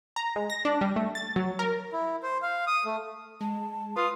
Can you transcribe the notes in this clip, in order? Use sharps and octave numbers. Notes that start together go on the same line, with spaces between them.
A#5
G#3
A#6
D4
G3
A3
A6
F#3
A#4
E4
C5
F5
D#6
A3
G#3 A5
F4 B4 D#6